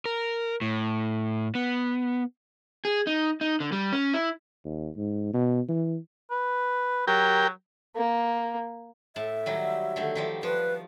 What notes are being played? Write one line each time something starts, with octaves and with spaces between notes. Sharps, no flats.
A#4
A2
B3
G#4
D#4
D#4
D3
G3
C#4
E4
D#2
G#2
B2
E3
B4
F#3 G4 A#4 G5
A#3
A2 E5 A5
D#3 F#3 G3
D3 D#3 A3
D#3 F3 G3
F3 B4